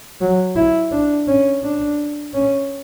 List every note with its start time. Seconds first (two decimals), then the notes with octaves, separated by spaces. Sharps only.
0.21 F#3
0.56 E4
0.92 D4
1.28 C#4
1.63 D4
2.34 C#4